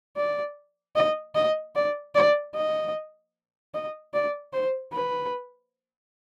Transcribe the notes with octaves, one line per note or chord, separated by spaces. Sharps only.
D5
D#5
D#5
D5
D5
D#5
D#5
D5
C5
B4